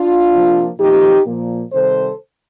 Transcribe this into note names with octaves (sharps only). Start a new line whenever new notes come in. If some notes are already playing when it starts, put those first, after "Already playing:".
Already playing: D4 F4
C3 F3 A#3
A#2 F3 A3 C4 D#4 G4
A#2 F3 A#3
C3 D#3 G3 A4 C5